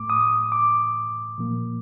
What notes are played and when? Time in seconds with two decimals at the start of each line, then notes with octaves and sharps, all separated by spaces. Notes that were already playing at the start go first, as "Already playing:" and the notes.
Already playing: A2 A3 D6
0.10 D#6
0.52 D6
1.38 A#2 F3 A#3